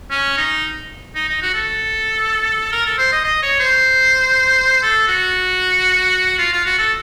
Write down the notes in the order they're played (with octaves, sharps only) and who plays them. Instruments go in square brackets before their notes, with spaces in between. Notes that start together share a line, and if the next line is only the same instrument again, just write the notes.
[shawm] C#4
D#4
D#4
D#4
F#4
A4
A#4
A4
C5
D#5
D#5
C#5
C5
A4
F#4
F4
F4
F#4
A4